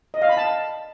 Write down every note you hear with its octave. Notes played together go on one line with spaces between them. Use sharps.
D#5
F5
B5
A5